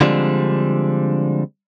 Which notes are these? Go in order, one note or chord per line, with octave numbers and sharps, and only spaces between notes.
D3 F3 G3 G#3 C4 D4